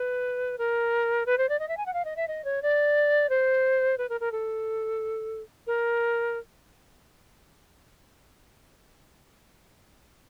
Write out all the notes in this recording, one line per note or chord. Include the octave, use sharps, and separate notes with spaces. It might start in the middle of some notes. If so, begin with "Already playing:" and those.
Already playing: B4
A#4
B4
C5
D5
D#5
E5
G#5
F#5
F5
D#5
E5
D#5
C#5
D5
C5
B4
A#4
A#4
A4
A#4